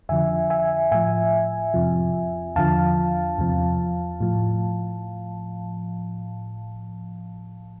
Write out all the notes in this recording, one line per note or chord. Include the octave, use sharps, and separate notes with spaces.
F2 D3 F3 E5 G#5
E5 G#5
A2 F3 E5 G#5
F2 C3 F3
E2 D3 F3 F5 A5
E2 C3 F3
A2 F3